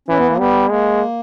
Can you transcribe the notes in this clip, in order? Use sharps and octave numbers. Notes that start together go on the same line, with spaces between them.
E3 C#4
B3
A#3
G3 B3
G#3 A#3